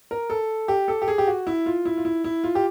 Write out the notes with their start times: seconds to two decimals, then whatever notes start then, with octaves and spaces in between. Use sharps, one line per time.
0.11 A#4
0.30 A4
0.68 G4
0.88 A4
1.02 G4
1.08 G#4
1.18 G4
1.27 F#4
1.47 E4
1.66 F4
1.85 E4
1.97 F4
2.05 E4
2.24 E4
2.44 F4
2.55 G4